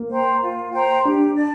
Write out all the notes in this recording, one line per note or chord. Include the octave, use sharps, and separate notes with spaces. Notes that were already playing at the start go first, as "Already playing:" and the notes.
Already playing: A#3
C5 G5 A#5
F4
C5 G5 A#5
D4 G4
D5 A5